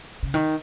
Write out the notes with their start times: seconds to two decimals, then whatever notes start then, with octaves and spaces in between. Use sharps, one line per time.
0.23 C#3
0.34 D#3